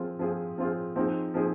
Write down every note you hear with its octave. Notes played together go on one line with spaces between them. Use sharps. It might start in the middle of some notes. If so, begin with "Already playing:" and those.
Already playing: F3 C4 F4 G#4
F3 C4 F4 G#4
F3 C4 F4 G#4
F3 C4 D#4 G#4
F3 C4 D#4 G#4